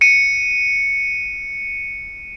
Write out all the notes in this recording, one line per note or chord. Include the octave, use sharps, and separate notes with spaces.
C#7 D#7